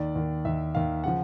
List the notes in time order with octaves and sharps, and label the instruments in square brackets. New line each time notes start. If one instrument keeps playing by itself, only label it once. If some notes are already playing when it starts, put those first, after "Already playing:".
Already playing: [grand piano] D#2 D#3 D5
D#2 D#3
D#2 D#3 E5
D#2 D#3 F5
C#3 F3 F#5